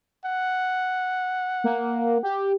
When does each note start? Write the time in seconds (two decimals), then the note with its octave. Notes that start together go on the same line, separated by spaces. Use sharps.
0.25 F#5
1.64 A#3
2.23 G4